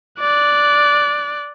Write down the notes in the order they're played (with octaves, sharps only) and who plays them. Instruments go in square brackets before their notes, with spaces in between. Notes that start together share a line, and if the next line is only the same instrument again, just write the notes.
[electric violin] D5 F#6